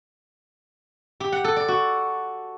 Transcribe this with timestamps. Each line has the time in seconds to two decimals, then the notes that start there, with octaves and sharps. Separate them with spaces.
1.20 G4
1.32 F#5
1.44 A4
1.56 D5
1.68 F#4